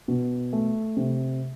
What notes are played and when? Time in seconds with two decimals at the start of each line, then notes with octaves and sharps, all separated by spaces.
0.08 B2
0.53 A3
0.97 C3